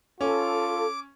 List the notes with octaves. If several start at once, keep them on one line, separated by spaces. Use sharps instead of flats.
C#4 F4 A4 D6